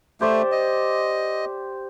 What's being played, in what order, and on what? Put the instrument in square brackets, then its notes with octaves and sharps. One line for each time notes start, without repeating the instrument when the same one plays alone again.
[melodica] A3 [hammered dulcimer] G4 C5 D5
[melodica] D#5